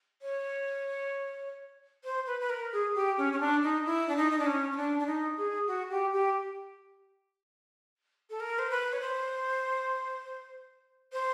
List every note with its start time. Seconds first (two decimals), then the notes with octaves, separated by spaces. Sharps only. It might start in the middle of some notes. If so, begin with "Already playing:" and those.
0.22 C#5
2.04 C5
2.26 B4
2.40 B4
2.49 A#4
2.72 G#4
2.94 G4
3.17 C#4
3.32 C#4
3.40 D4
3.63 D#4
3.85 E4
4.08 D4
4.16 D#4
4.31 D#4
4.38 D4
4.46 C#4
4.72 C#4
4.76 D4
4.99 D4
5.06 D#4
5.37 G#4
5.67 F#4
5.90 G4
6.12 G4
8.30 A4
8.40 A#4
8.58 C5
8.70 B4
8.92 C#5
9.00 C5
11.12 C5